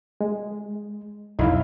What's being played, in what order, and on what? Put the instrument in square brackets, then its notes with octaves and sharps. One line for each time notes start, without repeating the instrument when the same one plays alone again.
[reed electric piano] G#3
[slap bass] B1 F2 F#3 [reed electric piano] D#4 E4 F5